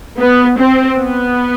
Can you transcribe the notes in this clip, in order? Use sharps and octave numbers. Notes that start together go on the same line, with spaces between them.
B3
C4
B3